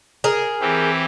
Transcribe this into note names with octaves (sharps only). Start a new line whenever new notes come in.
G#4 A#4
E3 C4 G4